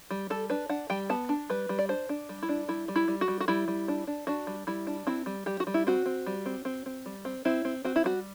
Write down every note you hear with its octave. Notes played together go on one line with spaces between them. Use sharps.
G3
G3 A4
D4 B4
D4 F#5
G3 G5
B3 A5
D4
G3 B4
G3
D5
D4 C5
D4
G3
E4
D4
G3 E4
G3
E4
G3
F#4
G3
F#4
G3 E4
G3
D4
D4
D4 F#4
G3
G3 E4
D4
C4 E4
G3
G3 G4
F#4
G3
E4
C4 F#4
C4
G3
C4
C4
C4
G3
C4
C4 E4
C4
C4 F#4
E4
G3 F#4